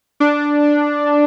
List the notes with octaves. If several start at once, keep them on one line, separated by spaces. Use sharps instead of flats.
D4